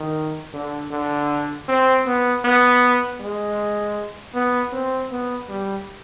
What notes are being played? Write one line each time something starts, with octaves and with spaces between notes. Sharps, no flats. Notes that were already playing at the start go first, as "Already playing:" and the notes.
Already playing: D#3
D3
D3
C4
B3
B3
G#3
B3
C4
B3
G3